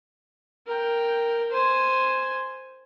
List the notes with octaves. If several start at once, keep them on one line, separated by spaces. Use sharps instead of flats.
A#4 G5
C5 G#5